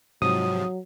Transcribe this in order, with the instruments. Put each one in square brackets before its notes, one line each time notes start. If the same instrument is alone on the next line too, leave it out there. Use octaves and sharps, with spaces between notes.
[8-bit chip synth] G#2 C3 F3 [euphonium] F#3 [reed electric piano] D#6